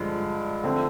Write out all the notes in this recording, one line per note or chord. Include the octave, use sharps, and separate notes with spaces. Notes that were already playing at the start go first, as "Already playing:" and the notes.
Already playing: G2 D3 F3 G#3
D3 F3 A3 C4